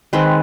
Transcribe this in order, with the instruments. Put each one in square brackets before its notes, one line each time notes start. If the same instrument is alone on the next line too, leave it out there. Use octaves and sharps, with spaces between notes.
[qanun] D#3 G#3 C4 B4